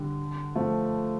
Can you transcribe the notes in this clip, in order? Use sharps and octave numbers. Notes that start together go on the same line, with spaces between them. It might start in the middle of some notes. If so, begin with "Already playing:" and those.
Already playing: D3 G3
F3 A3